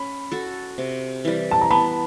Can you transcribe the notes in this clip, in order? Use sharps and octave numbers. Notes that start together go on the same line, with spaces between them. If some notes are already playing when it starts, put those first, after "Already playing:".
Already playing: C#4 B5
F#4 A4
C3
E3 G3
A5
A#5
B3 A5 B5